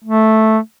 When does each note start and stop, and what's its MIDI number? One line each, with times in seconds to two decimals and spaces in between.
0.04 0.58 57